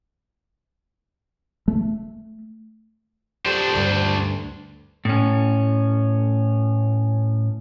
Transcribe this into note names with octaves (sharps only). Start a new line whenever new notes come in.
A3
D4 G4 A4 C5
D2 G2 D3
A2 C#4